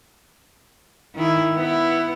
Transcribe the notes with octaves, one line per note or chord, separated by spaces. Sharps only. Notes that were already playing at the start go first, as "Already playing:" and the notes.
D#3 E4
B3 E4